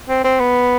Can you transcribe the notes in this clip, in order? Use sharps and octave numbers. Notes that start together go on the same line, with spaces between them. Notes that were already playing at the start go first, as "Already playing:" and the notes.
C4
C4
B3